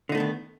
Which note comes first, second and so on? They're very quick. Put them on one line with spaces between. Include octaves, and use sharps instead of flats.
D3 D#4 A3 B3 D#3